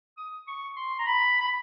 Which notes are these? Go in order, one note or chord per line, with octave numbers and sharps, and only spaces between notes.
D#6
C#6
C6
A#5
B5
B5